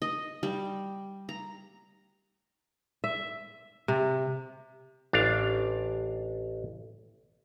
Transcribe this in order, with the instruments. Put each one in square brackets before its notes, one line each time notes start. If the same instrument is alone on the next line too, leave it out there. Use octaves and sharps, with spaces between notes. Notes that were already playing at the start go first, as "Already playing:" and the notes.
[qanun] D#5
G3
A#5
[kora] E5
C3
[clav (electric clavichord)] A1 D4 F5